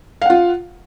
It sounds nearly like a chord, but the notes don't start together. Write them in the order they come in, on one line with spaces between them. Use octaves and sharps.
F5 F#5 F4